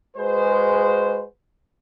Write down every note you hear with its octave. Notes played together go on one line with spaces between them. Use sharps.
G#3 F#4 G#4 B4 C5